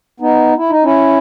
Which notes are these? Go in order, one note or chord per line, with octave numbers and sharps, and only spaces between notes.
B3 D#4
E4
D#4
C#4 E4